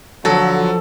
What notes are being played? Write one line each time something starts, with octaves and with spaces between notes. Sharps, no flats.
D3 F3 F#3 A4